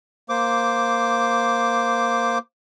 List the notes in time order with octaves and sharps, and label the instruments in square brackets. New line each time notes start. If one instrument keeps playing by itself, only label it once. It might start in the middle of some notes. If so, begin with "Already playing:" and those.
[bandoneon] A#3 C5 D6